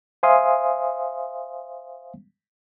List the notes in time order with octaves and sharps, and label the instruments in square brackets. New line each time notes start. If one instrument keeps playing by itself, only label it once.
[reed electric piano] C5 E5 F5 G#5 C6 D#6